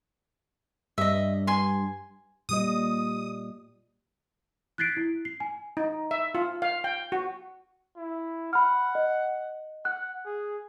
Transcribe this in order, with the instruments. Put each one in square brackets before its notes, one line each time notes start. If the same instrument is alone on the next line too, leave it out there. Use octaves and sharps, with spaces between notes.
[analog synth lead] G2 [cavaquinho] D#5 E5
[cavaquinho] G#5 C6
[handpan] A#2 G3 D#5 [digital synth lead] D#6
[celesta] F#6 G#6 A6 B6 C7 D7
E4
C7
G#5
[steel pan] D#4
E5
F4
F5
G5
F#4
[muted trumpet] E4
[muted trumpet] F#5 [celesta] B5 F6
[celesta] D#5
[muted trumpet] F#5 [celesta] F#6
[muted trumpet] G#4